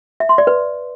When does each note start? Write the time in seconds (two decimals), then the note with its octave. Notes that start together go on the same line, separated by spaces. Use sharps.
0.20 E5
0.29 C6
0.38 D5
0.47 B4